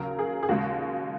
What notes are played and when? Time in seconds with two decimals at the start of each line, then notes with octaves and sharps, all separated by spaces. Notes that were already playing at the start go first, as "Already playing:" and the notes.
Already playing: D#2 C#3 F#3 A#4
0.19 G#4
0.43 G#4
0.49 D#2 C#3 G#3 F#4